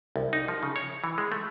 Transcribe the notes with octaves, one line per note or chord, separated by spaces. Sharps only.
C2
D#4
F3
C#3
C#5
E3
G#3
A3